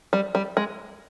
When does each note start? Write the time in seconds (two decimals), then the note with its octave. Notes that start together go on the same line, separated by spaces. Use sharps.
0.13 G3
0.35 G3
0.57 G#3